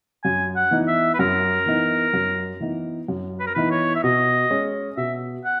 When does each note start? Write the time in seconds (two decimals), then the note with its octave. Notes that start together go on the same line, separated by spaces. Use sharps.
0.24 F#2 G#5
0.56 F#5
0.71 E3 B3 D#4
0.88 E5
1.14 B4
1.19 F#2 A#4
1.66 E3 B3 D#4
2.13 F#2
2.60 E3 B3 D#4
3.08 F#2
3.40 B4
3.47 A#4
3.54 E3 B3 D#4 B4
3.71 C#5
3.95 E5
4.04 B2 D#5
4.50 G#3 C#4
4.97 B2 E5
5.45 F#5